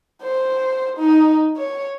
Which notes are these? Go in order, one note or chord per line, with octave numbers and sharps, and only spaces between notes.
C5
D#4
C#5